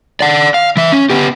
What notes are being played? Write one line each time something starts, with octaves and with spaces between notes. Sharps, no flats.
D5 F#5
F5
E3 E5
C#4
B3 G4